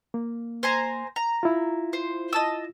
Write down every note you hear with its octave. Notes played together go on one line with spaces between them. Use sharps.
A#3
C5 G#5 A#5
A#5
E4 F4
C5
D#5 A5 E6